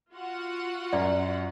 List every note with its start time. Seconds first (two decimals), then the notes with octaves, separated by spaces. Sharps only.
0.13 F4 F#4 F#5
0.93 F#2 D5